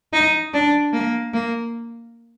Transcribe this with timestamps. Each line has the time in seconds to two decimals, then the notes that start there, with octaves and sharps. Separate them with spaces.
0.13 D#4
0.54 D4
0.93 A#3
1.34 A#3